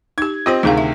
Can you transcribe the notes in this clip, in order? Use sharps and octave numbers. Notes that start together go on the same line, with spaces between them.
D#4 G4 G#6
C4 F4 G4 C5 D#5
D2 C3 D#3 D#4 G#4 F5
E5